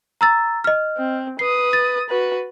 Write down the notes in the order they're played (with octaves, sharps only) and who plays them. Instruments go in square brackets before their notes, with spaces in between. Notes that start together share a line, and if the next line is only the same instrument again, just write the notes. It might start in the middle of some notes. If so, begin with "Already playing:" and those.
[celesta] A#5 E6 A6
D#5 F6
[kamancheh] C4
[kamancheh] B4 D#6 [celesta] C7
[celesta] A6
[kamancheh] F#4 B4